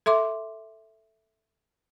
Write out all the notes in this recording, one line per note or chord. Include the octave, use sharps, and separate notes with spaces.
A4 E5 C6 D6